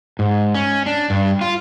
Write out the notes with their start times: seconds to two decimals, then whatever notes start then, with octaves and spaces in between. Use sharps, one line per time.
0.19 G#2
0.54 C#4
0.86 D4
1.10 G2
1.41 F4